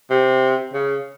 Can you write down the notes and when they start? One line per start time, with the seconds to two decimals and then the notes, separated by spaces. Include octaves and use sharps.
0.10 C3
0.73 C#3